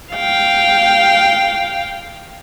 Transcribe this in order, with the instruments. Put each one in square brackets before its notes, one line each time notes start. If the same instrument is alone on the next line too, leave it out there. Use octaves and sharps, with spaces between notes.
[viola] F5 G5